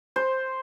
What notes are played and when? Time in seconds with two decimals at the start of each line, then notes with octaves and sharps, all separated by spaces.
0.16 C5